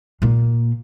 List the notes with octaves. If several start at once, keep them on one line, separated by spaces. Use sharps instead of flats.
A#2 A#3